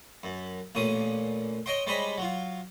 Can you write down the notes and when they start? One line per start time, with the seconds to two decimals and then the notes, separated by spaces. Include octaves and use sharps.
0.23 F#2
0.75 A1 A#2 C#4 D#6
1.66 C#5 D#5 G5 C6
1.87 G3 G#3 C5 C#5 D#5 B5
2.18 F#3 F4